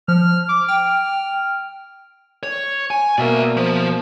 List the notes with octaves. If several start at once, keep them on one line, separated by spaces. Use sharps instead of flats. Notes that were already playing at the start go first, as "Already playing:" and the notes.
F3 F6
D6
G5 F6
C#5
G#5
B2 A#3 D5 E5
F3